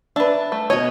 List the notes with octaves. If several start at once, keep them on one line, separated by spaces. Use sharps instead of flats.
D4 B4 E5 A5
A3
B2 C#5 D#5